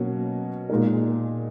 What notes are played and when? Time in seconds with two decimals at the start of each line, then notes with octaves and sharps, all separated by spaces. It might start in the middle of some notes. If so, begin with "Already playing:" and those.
Already playing: B2 F#3 A#3 C#4 F#4
0.70 A#2 G#3 D#4 A#4